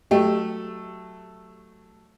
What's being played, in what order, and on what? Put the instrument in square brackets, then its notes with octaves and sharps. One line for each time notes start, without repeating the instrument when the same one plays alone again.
[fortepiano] F#3 A3 [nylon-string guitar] G4